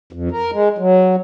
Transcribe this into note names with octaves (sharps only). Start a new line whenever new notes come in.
F2
A#4
G#3
F#3